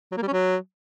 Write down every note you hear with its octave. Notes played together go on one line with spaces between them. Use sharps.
F#3
A#3
G3
C#4
F#3